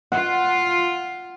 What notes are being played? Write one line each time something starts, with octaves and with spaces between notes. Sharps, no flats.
F4 F#5